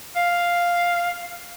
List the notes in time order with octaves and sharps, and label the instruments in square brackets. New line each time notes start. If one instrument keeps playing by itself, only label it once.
[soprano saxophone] F5